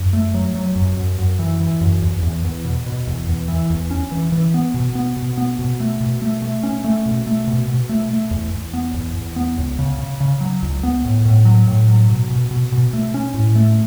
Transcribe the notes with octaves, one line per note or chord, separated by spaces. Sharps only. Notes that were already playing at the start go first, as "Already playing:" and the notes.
Already playing: F#2
A3
F#3
F#3
F#2
F#2
F#2
E3
E3
F#2
E2
E2
E2
B2
B2
E2
E2
E3
E2
C#4
E3
E3
B3
B2
B3
B2
B3
B2
A3
B2
A3
A3
C#4
A3
B2
A3
B2
B2
A3
A3
E2
E2
B3
E2
E2
B3
C#2
C#3
C#3
C#3
F#3
C#2
B3
A2
A2
F#3
A2
F#3
B2
B2
B2
B2
A3
C#4
A2
A3